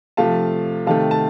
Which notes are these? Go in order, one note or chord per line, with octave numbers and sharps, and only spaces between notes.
C3 F3 A3 F5 A5
C3 D#3 A3 F5 A5
A5